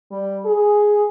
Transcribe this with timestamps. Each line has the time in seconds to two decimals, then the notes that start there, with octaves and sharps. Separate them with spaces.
0.12 G3
0.45 G#4